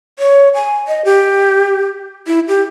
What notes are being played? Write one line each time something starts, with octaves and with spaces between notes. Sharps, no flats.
C#5
G#5
D#5
G4
E4
G4